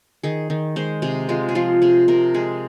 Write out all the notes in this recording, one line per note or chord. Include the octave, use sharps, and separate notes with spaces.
D#3 G#4
D#3
G#3 C5
C3 G#4
G#3 F4
G#4
F3 F4
C3 G#4
C3 A#4
G#3 G#4